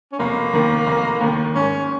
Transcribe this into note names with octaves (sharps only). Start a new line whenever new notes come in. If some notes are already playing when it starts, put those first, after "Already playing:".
C#4
F1 A#3
D#2 D#3
F1
D#2 D#3
G#2 C#4